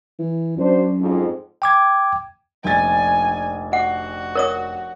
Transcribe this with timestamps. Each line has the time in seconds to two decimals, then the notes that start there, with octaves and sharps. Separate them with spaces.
0.19 E3
0.57 F#2 D4 F#4 C5
0.99 F2 G#2
1.62 G5 D6 G#6
2.64 F1 A#1 G#5 A6
3.73 F#4 F#5
4.35 A#4 C#5 D#6